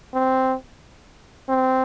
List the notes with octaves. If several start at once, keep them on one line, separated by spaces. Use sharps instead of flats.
C4
C4